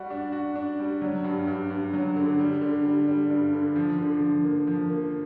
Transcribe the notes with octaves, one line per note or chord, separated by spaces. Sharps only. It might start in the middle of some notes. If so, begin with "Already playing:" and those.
Already playing: G3 F#4
D4
F#4
D4
G3
F#3
G2
G2
G2
F#3
D3
G3
D3
G3
G3
G2
D3
F3
D3
F3
A#3
F3
A#3